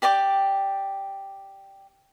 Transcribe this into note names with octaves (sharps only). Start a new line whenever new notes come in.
G4 D5 G5 D6